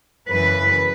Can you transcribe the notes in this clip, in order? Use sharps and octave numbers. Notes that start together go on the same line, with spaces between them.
F#2 C#3 E3 B4